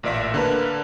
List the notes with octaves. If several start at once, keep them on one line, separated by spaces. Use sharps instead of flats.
A1 A#2 D5 E5 B6
D3 A#3 D4 A#4 B4